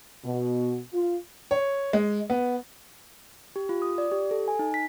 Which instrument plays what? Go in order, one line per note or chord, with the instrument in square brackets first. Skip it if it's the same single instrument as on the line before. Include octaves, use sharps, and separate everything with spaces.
[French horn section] B2
F4
[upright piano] C#5
G#3
B3
[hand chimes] G4
F4
D#6
D5
G4
A4
G#5
D#4
B6